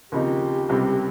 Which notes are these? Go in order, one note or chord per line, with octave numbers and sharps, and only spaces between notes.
D#2 C#3 F3 C4 D#4 G4
C#2 C3 G3 C4